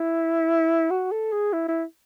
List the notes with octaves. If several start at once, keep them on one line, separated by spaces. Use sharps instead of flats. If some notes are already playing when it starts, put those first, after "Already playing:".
Already playing: E4
F#4
A4
G#4
E4
E4